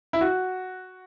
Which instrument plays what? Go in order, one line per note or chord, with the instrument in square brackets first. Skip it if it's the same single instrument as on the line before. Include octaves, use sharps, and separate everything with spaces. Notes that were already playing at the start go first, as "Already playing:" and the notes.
[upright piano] E4
F#4